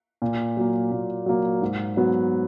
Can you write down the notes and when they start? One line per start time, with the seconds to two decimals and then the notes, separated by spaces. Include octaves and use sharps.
0.22 A#2
0.57 F#3 A#3
0.92 A#2
1.26 F#3 A#3
1.62 G#2
1.97 F#3 B3